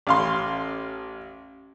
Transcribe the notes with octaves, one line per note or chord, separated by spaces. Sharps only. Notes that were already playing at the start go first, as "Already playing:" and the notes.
A1 F5 C6